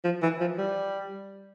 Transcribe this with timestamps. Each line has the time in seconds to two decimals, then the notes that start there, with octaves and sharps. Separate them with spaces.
0.04 F3
0.23 E3
0.40 F3
0.58 G3